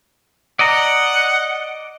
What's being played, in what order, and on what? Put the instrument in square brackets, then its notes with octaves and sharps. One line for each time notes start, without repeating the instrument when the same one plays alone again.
[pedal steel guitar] D5 D#5 A#5 [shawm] F#5